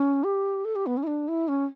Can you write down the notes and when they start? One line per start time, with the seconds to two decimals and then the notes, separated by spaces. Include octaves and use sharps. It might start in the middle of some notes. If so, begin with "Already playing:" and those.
Already playing: C#4
0.24 G4
0.65 A4
0.76 G4
0.86 B3
0.97 C#4
1.03 E4
1.07 D4
1.28 E4
1.48 C#4